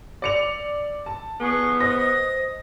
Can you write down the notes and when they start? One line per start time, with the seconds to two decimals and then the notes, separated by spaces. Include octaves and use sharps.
0.22 D5 C#7 F7
1.06 A5
1.40 B3 G#4 C#6
1.80 C5 D#5 D#6 A#6